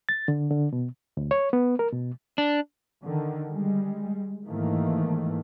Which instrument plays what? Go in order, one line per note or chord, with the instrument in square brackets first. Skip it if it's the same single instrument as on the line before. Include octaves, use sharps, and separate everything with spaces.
[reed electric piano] A6
D3
D3
B2
D2
C#5
B3
A#4
B2
[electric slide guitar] D4
[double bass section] D3 D#3
G3 G#3
G#2 D#3 E3 A3 A#3